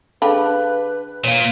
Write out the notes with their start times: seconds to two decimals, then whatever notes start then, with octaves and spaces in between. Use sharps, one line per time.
0.22 D3 G#4 B4 F5 G5 A5 B5
1.24 A#2 C#5 F5